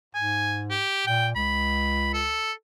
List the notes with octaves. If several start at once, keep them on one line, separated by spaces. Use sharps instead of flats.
G#2 G#5
G4
A#2 G5
C#2 B5
A4